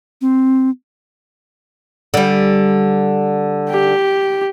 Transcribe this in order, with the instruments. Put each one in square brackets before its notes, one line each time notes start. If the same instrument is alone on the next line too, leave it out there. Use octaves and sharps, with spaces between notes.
[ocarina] C4
[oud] D3 G3
[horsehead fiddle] G4